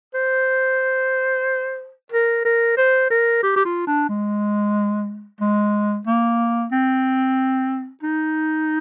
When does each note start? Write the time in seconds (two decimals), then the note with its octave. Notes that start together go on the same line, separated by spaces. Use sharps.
0.14 C5
2.12 A#4
2.45 A#4
2.77 C5
3.10 A#4
3.43 G4
3.56 G4
3.65 F4
3.87 D4
4.09 G#3
5.41 G#3
6.07 A#3
6.72 C4
8.03 D#4